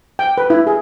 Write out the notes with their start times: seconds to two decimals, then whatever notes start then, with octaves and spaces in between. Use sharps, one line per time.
0.19 G5
0.38 B4
0.50 E4
0.67 G#4